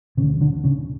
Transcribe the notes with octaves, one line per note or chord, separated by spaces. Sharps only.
D2 C#3 D3 C#4
D3 D4
C#3 C#4